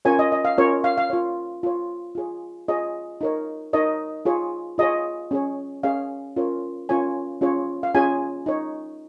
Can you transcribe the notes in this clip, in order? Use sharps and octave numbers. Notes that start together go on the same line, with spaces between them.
C#4 F4 A#4 C#5 G#5
D#5
D#5
F5
C#4 F4 A#4 C#5
F5
F5
F4 C#5
F4 C#5
F4 G#4 C#5
F4 G#4 C#5 D#5
D#4 A#4 C#5
D#4 A#4 C#5 D#5
F4 G#4 C#5
F4 G#4 C#5 D#5
C#4 G#4 C#5
C#4 G#4 C#5 F5
C#4 F4 A#4 C#5
C#4 F4 A#4 C#5 G#5
C#4 F4 G#4 C#5
F5
C#4 F4 G#4 C#5 G#5
D#4 C#5